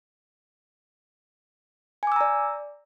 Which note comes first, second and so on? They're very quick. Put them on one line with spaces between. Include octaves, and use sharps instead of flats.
G#5 D6 E6 A#5 D5